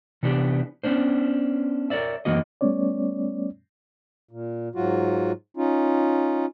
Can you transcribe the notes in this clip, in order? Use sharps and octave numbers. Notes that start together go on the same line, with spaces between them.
C3 E3 B3 D4 G4
B3 C#4 D4 C5
A#4 B4 C#5 D5 E5
F#2 E3 A#3 F#4 D#5
G3 A3 B3 C#4 C#5 D5
A#2
G#2 F#3 F4 F#4
C#4 D#4 F4